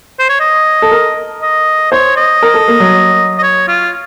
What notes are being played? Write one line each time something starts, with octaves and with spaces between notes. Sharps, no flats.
C5
C#5
D#5
A4
A#4
D#5
C5 C#5
D#5
A#4
A4
A#3
F#3
D#5
C#5
F4